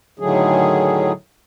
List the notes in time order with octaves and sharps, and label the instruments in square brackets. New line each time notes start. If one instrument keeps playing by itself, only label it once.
[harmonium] A2 D3 D#3 F#3 A3 G#4